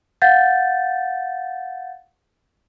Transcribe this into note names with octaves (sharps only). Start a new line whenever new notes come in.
F5 F#5 G6 A6